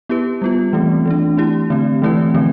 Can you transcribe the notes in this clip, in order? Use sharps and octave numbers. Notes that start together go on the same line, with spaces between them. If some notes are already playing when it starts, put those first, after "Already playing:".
B3 E4 G4 B4
G3 B3 F4
E3 A3 C4
E3 A3 D4
A3 E4 G4
D3 A3 C4
E3 A3 C4 E4 B4
D3 F3 A3 C4